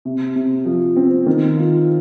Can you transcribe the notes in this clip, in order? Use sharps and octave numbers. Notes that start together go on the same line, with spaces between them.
C3
C3
F3
C4
D#3
F4